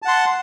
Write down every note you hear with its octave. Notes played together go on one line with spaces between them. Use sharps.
F#5 A5 C6